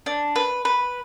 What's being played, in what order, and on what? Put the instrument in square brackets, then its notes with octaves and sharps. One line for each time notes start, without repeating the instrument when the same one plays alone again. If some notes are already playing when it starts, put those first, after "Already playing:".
[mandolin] D4
B4
B4